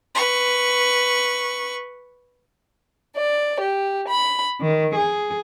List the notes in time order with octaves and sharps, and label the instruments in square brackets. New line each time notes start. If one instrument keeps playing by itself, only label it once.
[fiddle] B4 C#6
[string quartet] D5
G4
B5
D#3
G#4